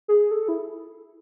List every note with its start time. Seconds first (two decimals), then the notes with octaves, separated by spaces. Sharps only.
0.08 G#4
0.31 A4
0.48 E4